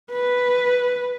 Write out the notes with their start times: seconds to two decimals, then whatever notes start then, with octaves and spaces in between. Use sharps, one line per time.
0.12 B4